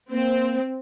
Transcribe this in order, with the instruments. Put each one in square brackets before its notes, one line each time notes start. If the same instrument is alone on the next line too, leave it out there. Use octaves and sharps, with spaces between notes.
[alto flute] A#3 [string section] C4